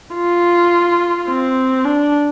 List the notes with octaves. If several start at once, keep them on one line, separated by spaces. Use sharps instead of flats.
F4
C4
D4